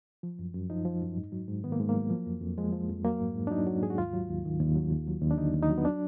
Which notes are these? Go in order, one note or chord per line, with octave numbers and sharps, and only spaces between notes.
F3
F#2
F#2
F3 D#4
F3
F#2
G#2
F#3
G#2
D#3 B3
A#3
G#2 G#3
A#3
F#3
F3
F2
F2
F3 G#3
F3
F2
F#3 A#3
G#2
G#2
D4
F#3 D#4
F#3
G#2 G#4
F#4
D#2 F4
F#3
D#2
D#3
D#2
F#3
D#2
F#3
D#2
D4
D3 D#4
D#2
D#4
F#3
B3
D4